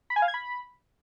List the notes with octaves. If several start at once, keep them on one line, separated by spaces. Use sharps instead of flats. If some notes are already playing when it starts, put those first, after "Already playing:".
B5
G#5
F5
G#6
B5